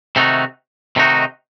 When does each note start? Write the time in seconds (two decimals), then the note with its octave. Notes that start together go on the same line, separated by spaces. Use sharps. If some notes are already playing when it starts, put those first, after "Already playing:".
0.16 C3 D#3 A3 D#4 F#4
0.96 C3 D#3 A3 D#4 F#4